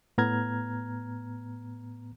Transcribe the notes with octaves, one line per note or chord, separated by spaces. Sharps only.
A2 B3 A#5 F6 G#6